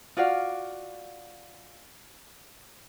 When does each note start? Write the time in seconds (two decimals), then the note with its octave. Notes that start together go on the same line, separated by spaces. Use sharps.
0.17 F4 F#4 D5 F5